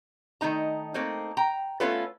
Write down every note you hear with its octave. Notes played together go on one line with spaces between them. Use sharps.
D#3 A3 D#4 A#5
A3 A#3 C4 D#4
G5 A#5
A3 B3 C#4 F4 A4 B4